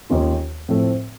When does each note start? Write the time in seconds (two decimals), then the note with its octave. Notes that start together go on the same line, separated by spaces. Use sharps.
0.10 D#2 D#3 G#3 C#4 F4
0.69 A2 F3 A3 C4